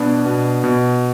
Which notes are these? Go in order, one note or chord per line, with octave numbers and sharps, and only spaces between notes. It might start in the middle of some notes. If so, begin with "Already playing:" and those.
Already playing: B2 B3 D4 B4
B2
B2